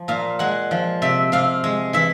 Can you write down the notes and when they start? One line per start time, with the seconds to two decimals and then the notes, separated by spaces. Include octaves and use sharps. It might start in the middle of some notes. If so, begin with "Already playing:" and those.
Already playing: F3
0.08 A#2 F5
0.39 G#3 F#5
0.71 F3
1.02 C3 E5
1.32 C3 F5
1.64 G#3
1.93 E3 E5